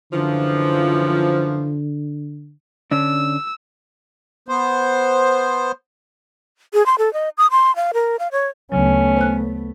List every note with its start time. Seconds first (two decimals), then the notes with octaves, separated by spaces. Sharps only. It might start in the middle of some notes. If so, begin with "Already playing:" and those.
0.12 F#2 D3 E3 F3
2.91 D3 C#4 D4 E6
4.49 B3 C5
6.74 G#4
6.86 C6
6.98 A4
7.14 D#5
7.38 D#6
7.51 C6
7.76 F5
7.94 A#4
8.19 F5
8.32 C#5
8.72 D2 C#3 F#3 A3 B3 C#4
9.17 C5 C#5 F#6